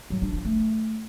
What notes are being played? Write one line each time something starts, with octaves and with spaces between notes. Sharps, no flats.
F#3
D4
F3
A3